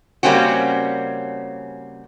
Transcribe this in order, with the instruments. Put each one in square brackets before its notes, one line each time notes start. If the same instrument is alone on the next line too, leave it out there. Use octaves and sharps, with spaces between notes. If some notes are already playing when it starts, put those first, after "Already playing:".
[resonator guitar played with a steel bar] C#3 G3 A#3 C4 C#4 F#4